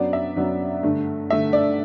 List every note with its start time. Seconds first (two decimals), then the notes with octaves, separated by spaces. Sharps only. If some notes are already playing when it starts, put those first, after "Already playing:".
Already playing: F#2 F#3 B3 D4 D5
0.13 E5
0.36 F#2 F#3 B3 D4
0.83 G2 D3 A3
1.30 G2 D3 A3 E5
1.53 D5